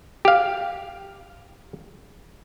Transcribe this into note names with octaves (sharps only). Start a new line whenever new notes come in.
G4 F5